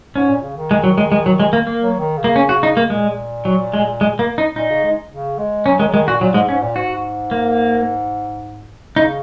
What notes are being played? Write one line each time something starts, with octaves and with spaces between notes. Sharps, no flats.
G#2 C#4
A#2
C#3
D#3
G#3
F#3
G#3
G#3
F#3
G#3
A#3
A#3
F#3
D#3
C#3
A#3
C#4
F#4
D#4
A#3
A#2 G#3
F#3
G#3
G#3
A#3
D#4
A#2 D#4
C#3
G#3
C#3
G#3
F#3 C#4
D#3 G#3
F#3
D#3 G#3
A#2 F#4
A#2 F#3
G#2 G#3
G#2 C#4
A#2
G#2 F#4
A#3
C#3 D#4